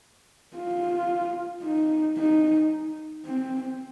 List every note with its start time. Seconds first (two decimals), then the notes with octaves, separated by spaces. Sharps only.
0.56 F4
1.64 D#4
2.18 D#4
3.25 C4